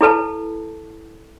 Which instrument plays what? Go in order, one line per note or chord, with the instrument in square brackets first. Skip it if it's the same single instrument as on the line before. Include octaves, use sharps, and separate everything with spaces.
[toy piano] E4 A4 B4 A5